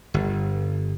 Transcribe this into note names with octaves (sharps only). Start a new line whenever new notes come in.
G1